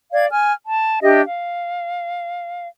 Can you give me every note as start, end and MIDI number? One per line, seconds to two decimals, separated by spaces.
0.13 0.26 74
0.13 0.26 77
0.13 0.26 92
0.30 0.52 80
0.30 0.52 89
0.66 0.98 81
1.01 1.20 62
1.01 1.20 67
1.01 1.20 75
1.01 1.20 76
1.25 2.67 77